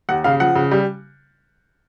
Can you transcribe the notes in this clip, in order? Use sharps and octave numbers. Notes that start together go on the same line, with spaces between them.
D#2 F#5
C#3 F5
F3 F#5
C#3
G3